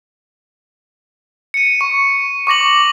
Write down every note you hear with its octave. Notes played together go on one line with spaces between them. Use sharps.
C#7 D#7
C#6
C#6 D6 A#6 F#7